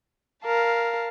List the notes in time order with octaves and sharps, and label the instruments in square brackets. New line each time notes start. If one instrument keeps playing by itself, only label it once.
[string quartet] A#4 F5 A5